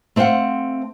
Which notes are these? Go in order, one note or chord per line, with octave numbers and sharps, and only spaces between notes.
A3 C4 C5 F5 F#5